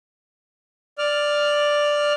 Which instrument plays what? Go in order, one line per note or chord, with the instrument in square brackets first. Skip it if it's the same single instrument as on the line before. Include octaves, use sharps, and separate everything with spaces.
[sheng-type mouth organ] D5 F6